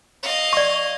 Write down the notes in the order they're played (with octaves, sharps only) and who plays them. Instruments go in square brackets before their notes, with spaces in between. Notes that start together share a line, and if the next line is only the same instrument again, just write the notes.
[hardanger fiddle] D#5 F5
[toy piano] D5 C#6